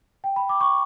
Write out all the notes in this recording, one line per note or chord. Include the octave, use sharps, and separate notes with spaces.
G5
B5
D6
C#6